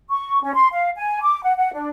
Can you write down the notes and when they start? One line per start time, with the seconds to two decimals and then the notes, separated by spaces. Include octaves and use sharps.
0.10 C#6
0.42 C#4
0.55 C6
0.72 F5
0.96 G#5
1.22 D6
1.43 F#5
1.57 F#5
1.73 D4